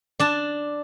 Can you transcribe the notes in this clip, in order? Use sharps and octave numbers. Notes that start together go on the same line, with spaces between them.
D4 A5